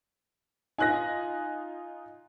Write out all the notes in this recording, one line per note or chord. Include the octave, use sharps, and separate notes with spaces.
D#4 F4 G#5 F#6 A#6